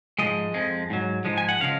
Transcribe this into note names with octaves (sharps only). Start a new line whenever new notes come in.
G#2 F3 G#3 D#5
F2 F3 G#3
G#2 F#3
G#2 F3 G#3
G#5
F#5
C#3 F3 G#3 F5